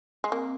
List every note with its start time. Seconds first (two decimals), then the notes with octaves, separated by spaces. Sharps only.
0.24 G#3
0.32 A#3 C4